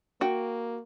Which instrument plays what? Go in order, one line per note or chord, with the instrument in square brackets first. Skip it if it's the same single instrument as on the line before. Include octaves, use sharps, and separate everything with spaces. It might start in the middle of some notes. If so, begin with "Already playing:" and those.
[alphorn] A#3 [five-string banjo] F#4 G5